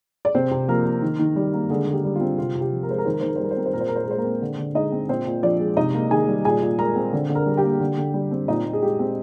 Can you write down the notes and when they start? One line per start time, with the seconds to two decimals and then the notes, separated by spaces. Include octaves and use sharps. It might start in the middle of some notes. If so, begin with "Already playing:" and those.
0.25 D5
0.34 C3 C4 C5
0.51 C3
0.68 F3 A#3 A#4
0.85 A#3
1.02 D#3
1.19 D#3
1.36 G3
1.53 A#3
1.70 D3 G#3 G#4
1.87 D3
1.93 G4
2.04 G3
2.15 F4
2.21 C4
2.38 C3 F4
2.55 C3
2.61 G4
2.72 F3
2.83 A#4
2.89 G#3 C5
2.98 A#4
3.05 D#3 C5
3.13 A#4
3.20 D#3 C5
3.28 A#4
3.36 C5
3.40 G3 A#4
3.51 C5
3.57 C4 A#4
3.66 C5
3.73 A#2 A#4
3.80 C5
3.88 A#2 A#4
3.96 C5
4.03 A#4
4.08 G#3 C5
4.18 A#3 A#4
4.25 C4
4.42 D3
4.58 D3
4.75 G#3 D#4 D#5
4.92 C4
5.09 A#2 C4 C5
5.26 A#2
5.43 F3 D4 D5
5.60 G#3
5.77 C3 D#4 D#5
5.94 A#3
6.11 D#3 G#4 G#5
6.28 G3
6.45 A#2 G#4 G#5
6.62 A#2
6.79 G#3 A#4 A#5
6.95 C4
7.13 D3
7.29 D3
7.35 A#4 A#5
7.46 G3
7.57 G4 G5
7.64 A#3
7.80 D3
7.97 D3
8.14 G3
8.31 C4
8.48 A#2 D#4 D#5
8.65 A#2
8.73 G#4
8.82 G#3 G4
8.99 C4